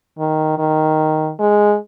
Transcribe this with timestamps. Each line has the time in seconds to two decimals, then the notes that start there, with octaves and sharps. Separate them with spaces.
0.18 D#3
0.58 D#3
1.40 G#3